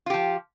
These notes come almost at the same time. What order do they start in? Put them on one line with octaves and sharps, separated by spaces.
F4 G4 F3